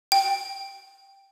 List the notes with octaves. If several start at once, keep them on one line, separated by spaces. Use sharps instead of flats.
G5